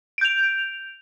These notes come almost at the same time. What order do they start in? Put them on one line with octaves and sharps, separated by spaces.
D7 G6 F7